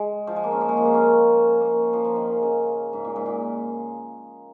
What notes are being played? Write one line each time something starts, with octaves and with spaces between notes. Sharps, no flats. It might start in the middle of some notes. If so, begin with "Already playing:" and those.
Already playing: G#3
F3
G#3
A#3
C#4
A#3
G#3
F3
A#3
C#4
A#3
F3
F3
D#3
C#3
C#3
G#2
A#2
G#2
A#2